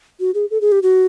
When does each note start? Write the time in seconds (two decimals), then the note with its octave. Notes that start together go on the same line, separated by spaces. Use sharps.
0.20 F#4
0.35 G#4
0.51 A4
0.61 G#4
0.72 G4
0.83 F#4